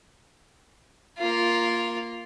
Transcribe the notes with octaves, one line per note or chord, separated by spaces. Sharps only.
A#3 F4